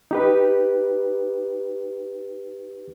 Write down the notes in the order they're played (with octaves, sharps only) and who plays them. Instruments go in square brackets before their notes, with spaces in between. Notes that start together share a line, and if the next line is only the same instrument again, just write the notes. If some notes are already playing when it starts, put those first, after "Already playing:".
[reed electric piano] D#4 G4 B4